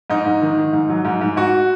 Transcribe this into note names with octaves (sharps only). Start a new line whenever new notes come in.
G#2 D#4
G#2
D#3
D#3
G#2
F#3
G#2
G#2
G#2 F#4